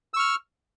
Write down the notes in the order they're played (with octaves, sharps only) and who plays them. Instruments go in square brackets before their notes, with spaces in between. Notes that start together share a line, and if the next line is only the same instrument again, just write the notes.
[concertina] E6
C#6
F6